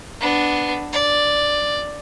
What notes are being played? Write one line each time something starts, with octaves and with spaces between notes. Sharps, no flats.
B3 D4
D5